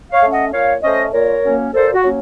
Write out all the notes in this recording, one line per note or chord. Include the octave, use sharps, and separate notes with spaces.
C#5 F5
A3 C#4
D#5 F#5
A#2 C#5 F5
A3 C#4 C5 D#5
A#2 A#4 C#5
F#3 A#3 C#4
A#2 A4 C5
F#4
F#3 A#3 C#4